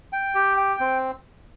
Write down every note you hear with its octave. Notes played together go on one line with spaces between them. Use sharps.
G5
G4
G5
C4